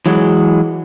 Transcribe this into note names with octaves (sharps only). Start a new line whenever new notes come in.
E3 F#3 G#3